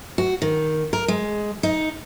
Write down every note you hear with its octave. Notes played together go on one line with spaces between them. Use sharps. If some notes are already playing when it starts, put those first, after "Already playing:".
F#4
D#3
A#4
G#3
D#4